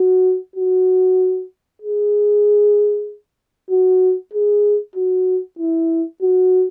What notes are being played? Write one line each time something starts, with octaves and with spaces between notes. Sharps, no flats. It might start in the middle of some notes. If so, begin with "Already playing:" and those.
Already playing: F#4
F#4
G#4
F#4
G#4
F#4
E4
F#4